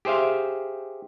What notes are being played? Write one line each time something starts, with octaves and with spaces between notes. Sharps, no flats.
G4 G#4 C5 E5 F5